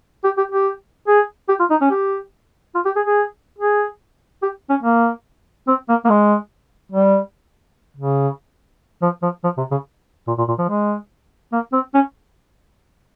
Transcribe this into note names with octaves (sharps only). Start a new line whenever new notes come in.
G4
G4
G4
G#4
G4
F4
D#4
C#4
G4
F4
G4
G#4
G#4
G#4
G4
C#4
A#3
C4
A#3
A#3
G#3
G3
C#3
F3
F3
F3
C3
C#3
A#2
A#2
A#2
F3
G#3
A#3
C4
C#4